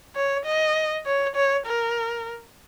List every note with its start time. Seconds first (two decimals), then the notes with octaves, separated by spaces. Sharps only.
0.16 C#5
0.45 D#5
1.06 C#5
1.35 C#5
1.66 A#4